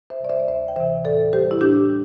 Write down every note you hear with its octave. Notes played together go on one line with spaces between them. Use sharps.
C5 E5
C3 G3 D5
C5 E5
D5
D2 C5 E5
G5
C3 E3 C5 E5
A2 A4 D5
G3 G4 C5
E4
A2 D4 G4
G3